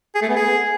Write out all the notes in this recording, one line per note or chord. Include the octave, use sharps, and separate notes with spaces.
G#4
A3
B3
G#4